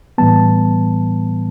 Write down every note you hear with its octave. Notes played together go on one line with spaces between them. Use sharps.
A2 E3 G3 B3 A5